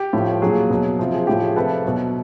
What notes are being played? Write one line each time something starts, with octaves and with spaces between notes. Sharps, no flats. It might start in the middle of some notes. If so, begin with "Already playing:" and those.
Already playing: G4
A2 F3
A#2 F#3 G#4
B2 F#3
C3 F3
G#4
A2 F3 G4
G#4
C3 F3 A4 B4
B2 F#3